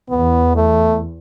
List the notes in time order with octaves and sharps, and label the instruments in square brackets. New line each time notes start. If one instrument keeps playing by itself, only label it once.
[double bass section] E2 [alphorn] B3
[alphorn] A3